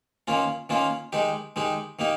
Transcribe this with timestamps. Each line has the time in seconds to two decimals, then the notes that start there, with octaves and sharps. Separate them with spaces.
0.27 D#3 A#3 C#4 F4
0.69 D#3 A#3 C#4 F4
1.13 D#3 G#3 D#4 G4
1.56 D#3 G#3 D#4 G4
1.99 D#3 A#3 D#4 G4